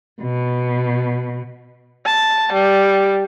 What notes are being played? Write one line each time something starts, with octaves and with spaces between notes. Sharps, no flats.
B2
A5
G3